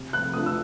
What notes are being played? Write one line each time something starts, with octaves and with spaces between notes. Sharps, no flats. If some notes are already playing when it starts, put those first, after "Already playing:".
Already playing: C3
F#6
F3 A3 D4 D#6
E6